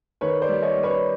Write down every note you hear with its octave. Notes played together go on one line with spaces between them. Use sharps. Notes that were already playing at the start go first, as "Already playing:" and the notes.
D#3 B4 C#5
C5 D5
G3
C#5 D#5
G3
B4 C#5